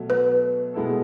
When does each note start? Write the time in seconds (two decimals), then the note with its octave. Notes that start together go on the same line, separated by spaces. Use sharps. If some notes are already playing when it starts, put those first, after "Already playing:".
Already playing: B2 F#3 A3
0.10 B4
0.74 B2 G#3 B3 E4 A4